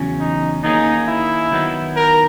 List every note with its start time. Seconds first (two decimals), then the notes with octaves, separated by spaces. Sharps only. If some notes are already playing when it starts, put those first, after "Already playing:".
Already playing: E2 C#3 F#3 C#4
0.20 D#4
0.63 D#2 D#3 A#3 C#4 D#4 G#4
1.08 E4
1.52 D#3 F#3 B3 D#4
1.96 A#4